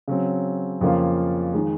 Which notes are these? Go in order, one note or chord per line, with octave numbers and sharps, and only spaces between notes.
C#3 F#3 C4
F2 C#3 F3 A#3 F4
D#3 G#3